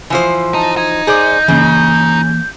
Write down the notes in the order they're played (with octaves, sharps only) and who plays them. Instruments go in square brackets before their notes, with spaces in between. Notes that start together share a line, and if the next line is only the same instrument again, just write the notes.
[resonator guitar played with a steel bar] E3 F3 C5
[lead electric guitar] D#4 [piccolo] A5
[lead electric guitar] D#4 [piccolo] G#6
[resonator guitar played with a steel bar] G#4 C5 D5 [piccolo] G6
[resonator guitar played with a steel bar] C#3 [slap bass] E3 A#3